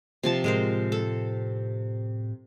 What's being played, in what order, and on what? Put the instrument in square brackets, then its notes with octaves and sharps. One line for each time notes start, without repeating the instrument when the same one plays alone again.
[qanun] C3 F3 A5
[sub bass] A2 [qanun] G#3 A#4 C5
[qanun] A4